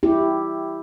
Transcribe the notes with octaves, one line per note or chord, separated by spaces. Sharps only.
E4 G4